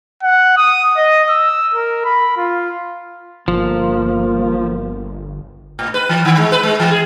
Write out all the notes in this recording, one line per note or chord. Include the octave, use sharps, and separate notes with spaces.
F#5
D#6
D#5
E6
A#4
B5
F4
G1 F3 A#3
A2
B4
E3
D#3
G#3
B4
G#3
E3
G#4